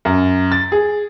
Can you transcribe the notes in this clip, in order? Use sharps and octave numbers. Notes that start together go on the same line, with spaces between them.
F#2
A6
G#4